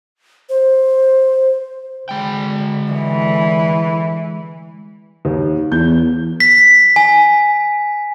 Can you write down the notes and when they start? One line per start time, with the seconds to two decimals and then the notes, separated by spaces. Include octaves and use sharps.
0.49 C5
2.09 D3 G#3 G5
2.92 E3
5.25 D#2
5.72 E2 G6
6.40 B6
6.96 G#5